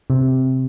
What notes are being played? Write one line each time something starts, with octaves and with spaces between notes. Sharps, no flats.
C3